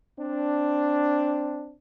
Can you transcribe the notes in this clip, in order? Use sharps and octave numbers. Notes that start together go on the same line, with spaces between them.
C4 D4